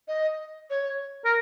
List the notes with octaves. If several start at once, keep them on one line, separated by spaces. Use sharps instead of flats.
D#5
C#5
A#4